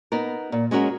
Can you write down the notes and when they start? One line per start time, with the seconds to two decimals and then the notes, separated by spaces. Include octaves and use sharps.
0.12 B3 D#4 A#4
0.52 A#2
0.71 G#3 C#4 F#4 A#4